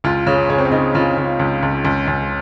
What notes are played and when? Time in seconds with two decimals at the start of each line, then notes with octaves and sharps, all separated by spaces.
0.04 C#2 F4
0.27 C#3 C#4
0.50 C#3 C#4
0.58 C4
0.65 C#4
0.72 C#3 D#4
0.95 C#3 F4
1.17 C#3
1.39 C#2
1.63 C#2
1.85 C#2
2.07 C#2